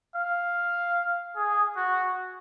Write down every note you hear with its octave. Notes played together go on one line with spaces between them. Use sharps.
F5
G#4
F#4